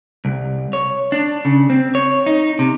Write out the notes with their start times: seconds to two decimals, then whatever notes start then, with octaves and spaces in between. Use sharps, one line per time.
0.25 C2
0.73 C#5
1.12 D4
1.45 C#3
1.70 C4
1.95 C#5
2.26 D#4
2.59 C3